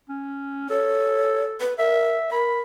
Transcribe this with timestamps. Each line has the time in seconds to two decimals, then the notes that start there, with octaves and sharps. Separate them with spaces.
0.09 C#4
0.69 A4 C#5
1.61 B4
1.78 A#4 E5
2.31 A#4 B5